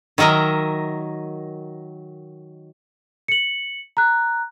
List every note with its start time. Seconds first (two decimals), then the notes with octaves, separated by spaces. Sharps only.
0.18 D#3 F#3 A#4 D#5 E5
3.28 C#7 F#7
3.97 A#5 F#6